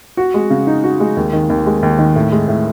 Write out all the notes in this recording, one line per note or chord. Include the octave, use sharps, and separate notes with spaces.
F#4
G#3
C#3
D#4
F#4
G#3
D#2
D#3
D#2
G#3
D#2
D#3
A2
G#3
A2